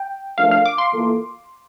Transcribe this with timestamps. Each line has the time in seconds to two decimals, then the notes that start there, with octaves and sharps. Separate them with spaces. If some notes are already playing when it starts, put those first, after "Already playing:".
Already playing: G5
0.37 F3 A3 D4 F4 A#4 F5
0.51 F5
0.66 D6
0.78 C6
0.93 E3 A#3 F4 A4